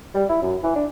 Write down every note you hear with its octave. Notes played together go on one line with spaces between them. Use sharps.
G3
E4
F#2
E3
D4